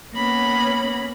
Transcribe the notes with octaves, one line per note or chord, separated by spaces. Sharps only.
A#3 B3 C#4 B5 A#6